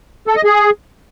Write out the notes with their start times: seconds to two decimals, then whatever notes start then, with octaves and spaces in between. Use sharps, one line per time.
0.27 A4
0.36 D#5
0.44 G#4